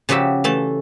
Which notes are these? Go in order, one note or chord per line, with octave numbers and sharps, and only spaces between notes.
C#3 F3 F#4 G4 E5
E3 A3 A5